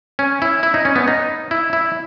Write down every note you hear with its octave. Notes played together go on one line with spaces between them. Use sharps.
C#4
E4
E4
D#4
C#4
B3
D#4
E4
E4